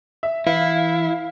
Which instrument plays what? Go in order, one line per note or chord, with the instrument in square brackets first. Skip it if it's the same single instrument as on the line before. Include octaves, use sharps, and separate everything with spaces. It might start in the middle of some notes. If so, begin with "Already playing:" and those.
[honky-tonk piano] E5
[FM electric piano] E3 [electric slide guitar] E4 [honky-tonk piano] F5